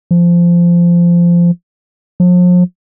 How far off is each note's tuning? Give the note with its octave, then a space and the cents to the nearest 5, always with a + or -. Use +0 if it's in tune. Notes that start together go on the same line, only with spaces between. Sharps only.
F3 -15
F3 +40